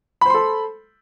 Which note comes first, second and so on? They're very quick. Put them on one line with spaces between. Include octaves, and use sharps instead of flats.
B5 C5 C6 A4